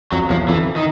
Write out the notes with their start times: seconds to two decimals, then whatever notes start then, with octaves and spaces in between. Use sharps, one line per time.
0.12 F2 F#3
0.30 E2 F3
0.48 F2 E3
0.76 D#3